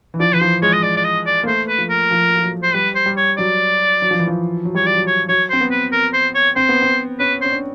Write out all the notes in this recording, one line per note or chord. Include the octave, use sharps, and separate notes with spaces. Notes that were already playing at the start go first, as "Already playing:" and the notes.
E3
F3 D5
E3 B4
F3 C5
G#3 C#5
D#5
D5
D5
D#5
D5
A#3
A3 C5
B4
F3
A#4
F3
F3
F#3
C5
G3 B4
C5
G3
C#5
F#3 D5
F#3
F3
E3
F3
F#3
G3 C#5
F#3
D5
F#3
C#5
F#3 C#5
C4 C5
B3
B4
A#4
C5
C#5
C4 C5
B3
C4
C#4 B4
C#4 C5
D4